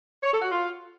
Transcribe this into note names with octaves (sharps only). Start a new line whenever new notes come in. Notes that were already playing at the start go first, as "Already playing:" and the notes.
C#5
A4
F#4
F4